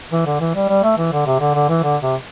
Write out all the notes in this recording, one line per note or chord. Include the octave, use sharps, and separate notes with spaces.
E3
D3
E3
G3
G3
A3
E3
D3
C3
D3
D3
E3
D3
C3